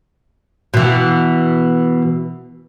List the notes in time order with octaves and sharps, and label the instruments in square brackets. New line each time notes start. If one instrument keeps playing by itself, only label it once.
[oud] B2 E3